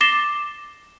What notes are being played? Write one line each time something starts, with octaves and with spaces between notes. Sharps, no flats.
D6 A6 A#6 C7 E7 G7